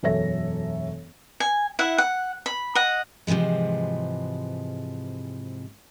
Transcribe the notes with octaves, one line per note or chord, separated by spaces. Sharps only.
E1 F#2 A4 C#5 E5 A#6
G#5
E4 E5 F#5
F#5
B5
D#5 F#5
G#2 C3 E3 F3 G#3